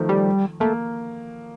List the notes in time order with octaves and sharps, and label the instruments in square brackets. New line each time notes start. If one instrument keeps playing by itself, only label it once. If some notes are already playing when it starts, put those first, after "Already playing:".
Already playing: [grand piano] D#3 F3 A3
[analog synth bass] G3
[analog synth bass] A3 [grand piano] A#3